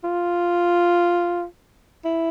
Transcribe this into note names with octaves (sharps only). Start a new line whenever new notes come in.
F4
E4